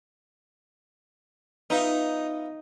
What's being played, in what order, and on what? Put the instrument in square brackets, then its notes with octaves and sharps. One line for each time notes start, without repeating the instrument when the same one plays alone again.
[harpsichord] B3 F4 E5 [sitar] D#4